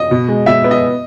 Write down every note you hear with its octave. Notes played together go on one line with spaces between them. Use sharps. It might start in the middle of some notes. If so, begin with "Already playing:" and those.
Already playing: D#5
B2
G#3
B2 E5
B3
D#5